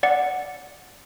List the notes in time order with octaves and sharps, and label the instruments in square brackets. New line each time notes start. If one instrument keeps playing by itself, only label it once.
[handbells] D5 F#5